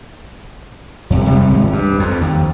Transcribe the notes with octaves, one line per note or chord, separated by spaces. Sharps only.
F2 C3
C3 G3 G#3
G#1 C#2
G2
F2
D#2